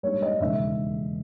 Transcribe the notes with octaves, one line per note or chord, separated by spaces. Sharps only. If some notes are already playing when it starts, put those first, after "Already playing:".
A#1 G#2 G3 A#3 C#5
D#5
E1 D#2 C#3 E5